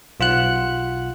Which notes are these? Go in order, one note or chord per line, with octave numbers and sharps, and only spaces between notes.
B1 F4 F#5 F#6